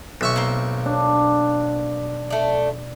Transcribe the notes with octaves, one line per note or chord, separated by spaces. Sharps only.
B1 E5 C#6
A#3 C4
D4
A3 D5